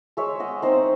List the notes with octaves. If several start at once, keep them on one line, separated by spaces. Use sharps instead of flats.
G#3 C#5 E5
D#5 F#5
C4 D#4 C5 D#5